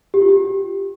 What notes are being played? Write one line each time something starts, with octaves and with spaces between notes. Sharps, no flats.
G4
F4
G4